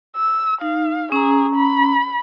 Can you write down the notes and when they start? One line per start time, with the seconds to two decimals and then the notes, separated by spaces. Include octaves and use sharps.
0.16 E6
0.61 D#4 F5
1.12 C#4 G#4 A#5
1.56 B5